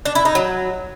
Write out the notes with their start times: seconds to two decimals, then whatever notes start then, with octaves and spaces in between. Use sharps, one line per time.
0.05 D4
0.15 E4
0.25 D#4
0.35 F#3